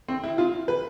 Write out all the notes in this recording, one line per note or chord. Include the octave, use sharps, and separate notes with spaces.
C4
E4
F4
B4